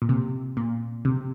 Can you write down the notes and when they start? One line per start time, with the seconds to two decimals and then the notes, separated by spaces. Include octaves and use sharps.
0.02 A#2
0.09 C3
0.57 A#2
1.05 C3